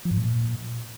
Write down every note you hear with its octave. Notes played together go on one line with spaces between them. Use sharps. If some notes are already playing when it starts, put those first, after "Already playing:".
F3
G#2
A#2